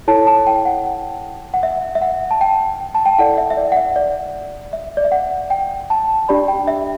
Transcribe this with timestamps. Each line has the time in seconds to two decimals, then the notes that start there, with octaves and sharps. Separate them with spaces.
0.08 E4 A4 C#5 A5
0.27 A5
0.47 G5
0.65 F#5
1.54 F#5
1.63 E5
1.95 E5
2.02 F#5
2.31 A5
2.41 G5
2.95 A5
3.06 G5
3.18 E4 A4 D5 F#5
3.37 E5
3.50 E5
3.57 D5
3.72 F#5
3.77 E5
3.96 D5
4.73 E5
4.97 D5
5.04 E5
5.12 F#5
5.50 G5
5.90 A5
6.29 D4 G4 D5 B5
6.48 G5
6.68 E5